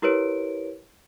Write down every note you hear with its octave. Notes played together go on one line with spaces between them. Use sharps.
E4 G4 A#4 B4 C#5 D7